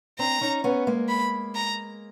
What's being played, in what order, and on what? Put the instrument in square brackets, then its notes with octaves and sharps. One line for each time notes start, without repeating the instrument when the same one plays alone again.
[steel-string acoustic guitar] C4 D4 [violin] A#5
[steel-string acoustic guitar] C#4 D#4
B3 C#4
G#3 A#3
[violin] B5
A#5